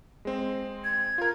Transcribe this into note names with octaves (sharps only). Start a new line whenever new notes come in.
G#3 C4
G#6
F4 A#4